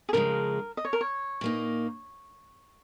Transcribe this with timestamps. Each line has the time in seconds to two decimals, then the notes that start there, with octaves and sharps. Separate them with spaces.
0.09 G#4
0.13 F2 C#3 F3 G#3 A#4
0.77 D#5
0.85 C#5
0.93 A#4
1.01 C#5
1.41 A#2 A#3 D#4